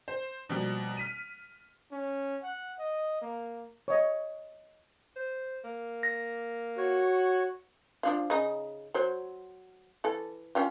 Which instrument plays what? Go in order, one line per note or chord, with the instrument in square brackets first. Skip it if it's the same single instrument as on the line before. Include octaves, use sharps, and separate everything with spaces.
[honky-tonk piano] C5
B2 F3 G3 A#3
F6 B6 D#7
[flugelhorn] C#4
F#5
D#5
A#3
[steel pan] C#5 D#5
[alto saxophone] C5
A#3
[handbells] A#6
[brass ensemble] F#4 [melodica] C#5
[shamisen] F3 D4 F4
C#3 D#4
F#3 C5
E3 A4
C#4 F4 G4